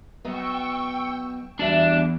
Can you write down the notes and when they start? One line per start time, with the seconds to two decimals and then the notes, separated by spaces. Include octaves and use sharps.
0.25 F#3 B3 D#5 G5 C#6 E6
1.59 E2 G3 D4 F#4 E5